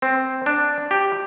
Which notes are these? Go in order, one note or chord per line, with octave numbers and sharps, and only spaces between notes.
C4
D4
G4